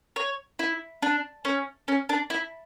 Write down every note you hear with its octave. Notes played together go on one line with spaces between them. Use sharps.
C#5
E4
D4
C#4
C#4
D4
E4